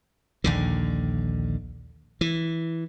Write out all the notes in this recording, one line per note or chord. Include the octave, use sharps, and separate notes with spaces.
A#1 D#2 D3
E3